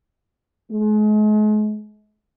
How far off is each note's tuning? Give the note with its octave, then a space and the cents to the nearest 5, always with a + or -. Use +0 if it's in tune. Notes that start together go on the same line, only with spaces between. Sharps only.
G#3 +40